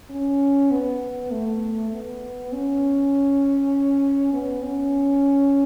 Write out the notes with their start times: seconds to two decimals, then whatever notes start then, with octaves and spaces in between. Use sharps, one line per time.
0.10 C#4
0.71 B3
1.31 A3
1.91 B3
2.52 C#4
4.33 B3
4.63 C#4